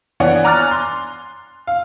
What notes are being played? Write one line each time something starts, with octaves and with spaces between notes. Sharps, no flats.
E3 B3 D4 C#5 F#5
G#5 A#5 D6 F6 F#6 A6
C6
F5